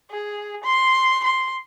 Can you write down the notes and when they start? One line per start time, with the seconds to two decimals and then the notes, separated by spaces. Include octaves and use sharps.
0.10 G#4
0.63 C6
1.24 C6